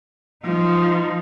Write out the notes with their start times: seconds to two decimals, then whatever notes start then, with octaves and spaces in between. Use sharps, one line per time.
0.45 F3 D#4